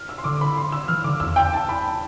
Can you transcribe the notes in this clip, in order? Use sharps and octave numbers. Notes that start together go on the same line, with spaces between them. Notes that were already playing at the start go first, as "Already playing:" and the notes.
Already playing: F6
E6
C6
D3 D6
B5
C6
E6
E3 F6
D3 D6
E2 E6
G5
A5
B5